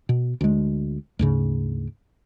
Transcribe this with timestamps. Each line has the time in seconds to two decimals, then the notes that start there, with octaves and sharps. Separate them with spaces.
0.09 B2
0.41 D2 G#3
1.19 D2 G#2 C#3